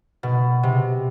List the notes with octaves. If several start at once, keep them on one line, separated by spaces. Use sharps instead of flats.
B2
C3